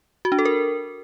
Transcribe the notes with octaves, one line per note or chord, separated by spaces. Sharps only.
F#4
D4
A4
A#4